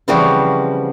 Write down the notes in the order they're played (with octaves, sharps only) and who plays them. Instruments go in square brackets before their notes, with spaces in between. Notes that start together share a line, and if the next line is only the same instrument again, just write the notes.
[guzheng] C#3 E3 F3 G3 C4 F#4